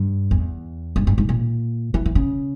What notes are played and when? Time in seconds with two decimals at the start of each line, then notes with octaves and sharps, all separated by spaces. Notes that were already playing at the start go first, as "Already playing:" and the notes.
Already playing: G2
0.31 E2
0.96 G2
1.07 G2
1.18 G#2
1.29 A#2
1.94 E3
2.06 E3
2.15 C#3